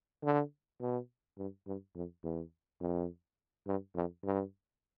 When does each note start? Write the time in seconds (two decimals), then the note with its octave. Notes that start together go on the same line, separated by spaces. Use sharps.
0.23 D3
0.80 B2
1.38 G2
1.66 G2
1.95 F2
2.24 E2
2.80 F2
3.67 G2
3.95 F2
4.24 G2